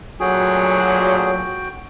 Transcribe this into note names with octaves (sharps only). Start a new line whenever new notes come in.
D2 A#2 F#3 F#4 G#4 G5